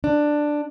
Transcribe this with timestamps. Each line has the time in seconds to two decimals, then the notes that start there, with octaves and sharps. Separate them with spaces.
0.04 D4